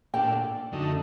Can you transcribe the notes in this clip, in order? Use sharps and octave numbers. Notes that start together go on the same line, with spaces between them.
A#2 A3 D4 G5
F#2 D3 A3 D#4